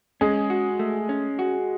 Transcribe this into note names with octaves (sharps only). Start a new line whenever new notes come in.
G#3 C#4 G#4
F#4
A3
C#4
F#4